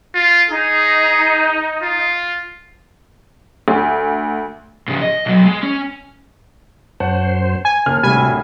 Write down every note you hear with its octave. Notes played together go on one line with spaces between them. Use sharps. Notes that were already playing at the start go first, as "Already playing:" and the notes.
F4
D#4 G#4
F4
D2
G#2 C#3
D#5
B1 F#3
G#3
C#4
F#2 C5 C#5 F#5 A5
G#5
D#2 C#3 A5 F6
G#1 D2 A2 C3 G3 G#5